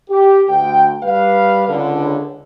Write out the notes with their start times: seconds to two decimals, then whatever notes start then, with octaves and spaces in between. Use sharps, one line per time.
0.10 G4
0.49 D2 G5
1.03 G3 B4 F5
1.68 C#2 D3